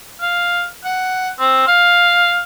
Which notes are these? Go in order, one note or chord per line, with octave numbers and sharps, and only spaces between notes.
F5
F#5
C4
F5